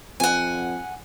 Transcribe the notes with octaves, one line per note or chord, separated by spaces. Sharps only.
F2 F#5 G#5